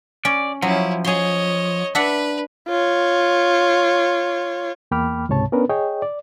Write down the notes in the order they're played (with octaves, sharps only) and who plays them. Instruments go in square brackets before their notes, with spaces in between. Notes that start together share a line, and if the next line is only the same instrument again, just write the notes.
[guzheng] C#4 [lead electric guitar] D5
[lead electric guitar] F3 [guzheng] F#3 [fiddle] C#4 E4
[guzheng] G#4 C6 [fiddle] C#5 D#5
[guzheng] D4 E5 F#5 [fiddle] B4
[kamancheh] F4 C#5
[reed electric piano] E2 A#3 G5 B5 D6 F6
C#2 G#2 C3 C#5 A5
B3 C#4 D4 A#4 B4
G#4 C#5 D#5 G5
D5